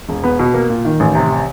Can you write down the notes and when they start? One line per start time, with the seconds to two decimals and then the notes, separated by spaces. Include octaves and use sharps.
0.09 E1
0.24 B3
0.39 B2
0.54 A#3
0.70 A#2
0.85 D#3
1.00 A1
1.15 C3